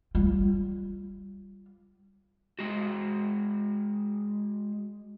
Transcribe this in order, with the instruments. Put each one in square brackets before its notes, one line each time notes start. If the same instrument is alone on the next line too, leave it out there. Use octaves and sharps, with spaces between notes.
[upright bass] G3 F4
[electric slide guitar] G#3 F#4